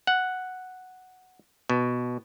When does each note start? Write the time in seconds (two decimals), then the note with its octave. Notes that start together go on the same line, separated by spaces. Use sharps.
0.07 F#5
1.69 B2